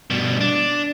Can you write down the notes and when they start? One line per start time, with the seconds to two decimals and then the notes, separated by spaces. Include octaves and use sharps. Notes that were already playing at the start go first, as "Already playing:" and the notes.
0.10 G2 B2
0.41 D4